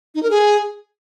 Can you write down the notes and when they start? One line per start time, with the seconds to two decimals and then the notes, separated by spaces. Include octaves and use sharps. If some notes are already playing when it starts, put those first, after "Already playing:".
0.15 D#4
0.23 A#4
0.31 G#4